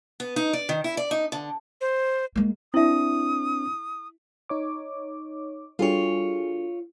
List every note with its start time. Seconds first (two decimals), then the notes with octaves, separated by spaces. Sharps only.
0.20 B3
0.36 D#4
0.53 D5
0.69 D#3
0.84 E4
0.97 D5
1.11 D#4
1.32 D3
1.81 C5
2.36 G#3 A#3
2.74 C4 D4 E4 E5 D#6
4.49 D#4 C#5 D6
5.79 G3 D4 F4 F#4 G#4 A4 C#5